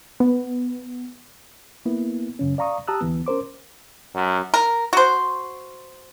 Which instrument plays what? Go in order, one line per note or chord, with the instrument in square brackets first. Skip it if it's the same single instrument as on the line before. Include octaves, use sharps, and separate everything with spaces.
[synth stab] B3
[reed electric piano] A#3 B3 E4
F#2 C#3 C#4
D5 F5 A#5 C#6 D#6
G4 A5 A#5 D#6 E6 F#6
D2 E3 B3
C#4 A#4 C5 D6
[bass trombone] F#2
[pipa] A#4
F#4 C5